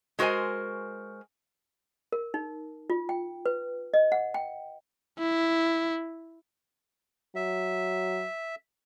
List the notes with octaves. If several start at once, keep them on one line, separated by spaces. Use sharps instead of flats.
G#3 F#4 A#4 C5 G#5
A#4
D#4
F4
G5
B4
D#5
F#5
G5
E4
F#3 E5